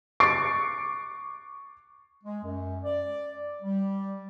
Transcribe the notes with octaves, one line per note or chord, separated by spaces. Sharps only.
C#6 D6 A6 C7 D7
G#3
F#2
D5
G3